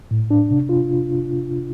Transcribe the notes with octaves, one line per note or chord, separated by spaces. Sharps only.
A2
D4
C3
F4